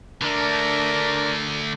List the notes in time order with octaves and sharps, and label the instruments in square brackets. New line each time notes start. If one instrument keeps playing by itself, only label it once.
[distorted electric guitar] D3 A3 [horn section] D4 A#4